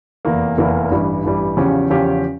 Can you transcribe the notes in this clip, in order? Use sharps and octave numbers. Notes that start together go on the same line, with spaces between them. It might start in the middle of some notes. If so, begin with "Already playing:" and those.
F1 E2 E3 A#3
F1 E2 E3 A#3
A1 G2 E3 G3
A1 G2 E3 G3
E2 C#3 F3 C#4 G4
E2 C#3 F3 C#4 G4